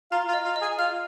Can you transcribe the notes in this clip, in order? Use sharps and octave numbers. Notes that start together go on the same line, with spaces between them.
F4 F5 A#5
F4 F5
D#5
F4 F5
D#5
G#4 G#5
F4 F5 F6